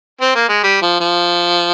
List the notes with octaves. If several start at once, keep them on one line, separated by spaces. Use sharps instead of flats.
C4
A#3
G#3
G3
F3
F3